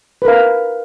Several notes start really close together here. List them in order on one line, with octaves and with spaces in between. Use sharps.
B4 A#4 F5